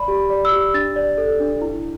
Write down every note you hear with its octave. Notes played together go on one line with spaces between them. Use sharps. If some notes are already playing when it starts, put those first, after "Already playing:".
Already playing: D5 B5
G4
D5
E6
G4
D4 A6
D5
A4
D4
E4